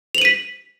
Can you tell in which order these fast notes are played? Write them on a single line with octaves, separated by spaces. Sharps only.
F7 F#7 D#7 B6